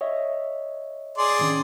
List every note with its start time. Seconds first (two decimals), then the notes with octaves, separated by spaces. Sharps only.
0.01 C#5 D#5 E5
1.18 G#4 D5 C6
1.39 A2 D#3 C#4